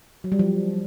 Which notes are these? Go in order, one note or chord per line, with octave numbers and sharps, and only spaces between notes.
F#3
G3
F3